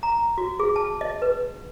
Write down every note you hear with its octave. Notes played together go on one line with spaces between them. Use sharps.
A#5
F#4
G#4
A5
D#5
B4